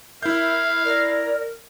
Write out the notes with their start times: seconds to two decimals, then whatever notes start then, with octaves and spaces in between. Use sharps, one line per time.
0.23 E4 A#4 E5 F5 G6
0.85 A#4 D5